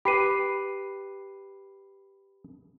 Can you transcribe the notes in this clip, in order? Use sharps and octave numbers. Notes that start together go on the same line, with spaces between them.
G4 B4 B5 C7 D#7